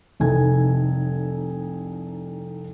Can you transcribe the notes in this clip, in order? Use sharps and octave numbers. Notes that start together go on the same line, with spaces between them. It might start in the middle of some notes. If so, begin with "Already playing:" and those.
F1 C2 D#4 A4 G#5 G#6